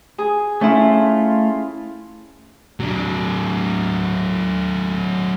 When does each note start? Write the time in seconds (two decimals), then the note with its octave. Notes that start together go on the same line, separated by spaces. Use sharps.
0.18 G#4
0.61 A3 C#4 E4 F4
2.80 F#3 D4